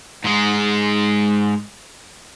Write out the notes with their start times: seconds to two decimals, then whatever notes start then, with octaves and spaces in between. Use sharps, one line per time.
0.24 G#2 G#3